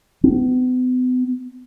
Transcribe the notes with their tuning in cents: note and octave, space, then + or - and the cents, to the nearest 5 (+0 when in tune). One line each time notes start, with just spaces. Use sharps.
B3 +40